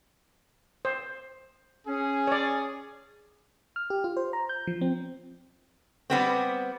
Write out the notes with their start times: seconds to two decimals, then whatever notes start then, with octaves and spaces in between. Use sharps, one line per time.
0.85 C5
1.87 C#4 G#4
2.27 C#5 D5
3.76 F6
3.90 G4
4.04 F4
4.17 C5
4.33 A#5
4.49 G6
4.67 F3
4.81 C4
6.10 G3 B3 C4